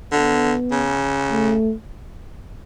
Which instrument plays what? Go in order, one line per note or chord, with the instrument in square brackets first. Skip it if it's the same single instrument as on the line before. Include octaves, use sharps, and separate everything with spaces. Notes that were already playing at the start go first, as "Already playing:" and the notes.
[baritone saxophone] D3 [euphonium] B3
[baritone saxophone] C#3
[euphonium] A3